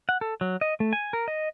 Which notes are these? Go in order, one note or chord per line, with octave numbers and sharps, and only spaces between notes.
F#5
A4
F#3
D#5
A3
G#5
A#4
D#5